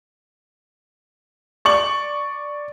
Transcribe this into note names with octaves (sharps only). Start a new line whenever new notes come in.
D5 C#6 F#7